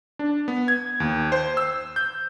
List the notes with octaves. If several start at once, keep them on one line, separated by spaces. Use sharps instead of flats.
D4
B3
G#6
D#2
C5
E6
G6